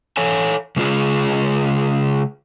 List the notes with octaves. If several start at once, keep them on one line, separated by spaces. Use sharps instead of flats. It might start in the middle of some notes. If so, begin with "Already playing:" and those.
A4 C#5 G#5
C#3 G#3 F4 G#4